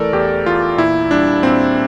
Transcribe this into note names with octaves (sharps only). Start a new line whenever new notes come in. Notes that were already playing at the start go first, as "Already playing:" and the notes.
Already playing: E3 A3 A4 A#4 D5
E2 G4
E2 F4
A#2 E4
G3 D4
A#2 C4